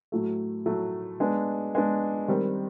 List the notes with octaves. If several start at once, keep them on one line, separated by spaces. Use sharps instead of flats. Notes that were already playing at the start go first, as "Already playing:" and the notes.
A2 F#3 A3
A2 F#3 A3
G#3 B3 D4
G#3 B3 D4
D#3 G3 C4